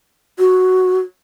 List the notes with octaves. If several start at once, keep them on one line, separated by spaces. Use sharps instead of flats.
F#4